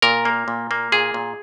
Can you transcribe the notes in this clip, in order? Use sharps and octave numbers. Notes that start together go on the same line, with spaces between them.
A#2 A#4
A#3
A#2
A#3
A#2 G#4
A#2